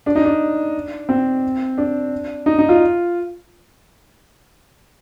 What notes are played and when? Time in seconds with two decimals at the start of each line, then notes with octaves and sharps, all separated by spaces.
0.06 D4
0.16 D#4
0.25 D4
1.09 C4
1.78 D4
2.46 D#4
2.59 D#4
2.69 F4